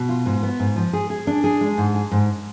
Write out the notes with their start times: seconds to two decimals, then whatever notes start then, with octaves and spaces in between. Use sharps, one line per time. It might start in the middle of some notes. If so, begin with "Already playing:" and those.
Already playing: B2
0.09 F4
0.26 G#2
0.43 B3
0.60 G#2
0.76 F3
0.93 G#4
1.10 G#4
1.27 D4
1.44 G#4
1.61 G#3
1.78 G#2
1.95 G#4
2.12 G#2